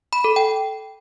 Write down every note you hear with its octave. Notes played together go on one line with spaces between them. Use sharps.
B5
A4
G5